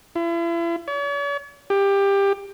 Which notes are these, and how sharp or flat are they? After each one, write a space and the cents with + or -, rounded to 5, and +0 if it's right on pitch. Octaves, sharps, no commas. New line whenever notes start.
E4 +40
C#5 +45
G4 +20